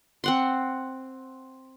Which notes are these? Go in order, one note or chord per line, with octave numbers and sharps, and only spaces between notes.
C4 F#5 C6